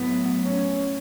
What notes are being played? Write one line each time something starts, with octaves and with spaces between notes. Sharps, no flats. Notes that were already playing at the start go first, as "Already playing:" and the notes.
Already playing: A2 F#3 B3
C#4